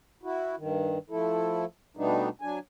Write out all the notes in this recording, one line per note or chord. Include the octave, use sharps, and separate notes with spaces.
E4 F#4
G2 D#3
F3 A3 E4 A4
B2 G3 A3 B3 D4 D#4
F#3 D4 G#5